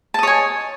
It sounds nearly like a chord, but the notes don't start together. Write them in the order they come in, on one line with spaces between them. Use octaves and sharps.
A5 D#5 C#5 G#5